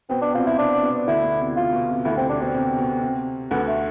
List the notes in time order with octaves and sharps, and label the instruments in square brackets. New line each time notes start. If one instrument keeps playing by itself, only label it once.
[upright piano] B2 B3 [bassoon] C4
[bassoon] D4
[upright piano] C3 C4 [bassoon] F4
[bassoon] E4
[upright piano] C3 C4 [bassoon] D4
[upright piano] B2 B3
[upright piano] D2 D3 [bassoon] E4
[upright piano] B2
C3
[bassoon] F4
[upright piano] B2
C3
[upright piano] D2 D3 [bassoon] E4
[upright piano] C3 [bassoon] C4
[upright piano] C3 [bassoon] D4
[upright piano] B2 [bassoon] C4
[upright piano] C3
B2
C3
[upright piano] D2 D3 [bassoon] B3
[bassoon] A3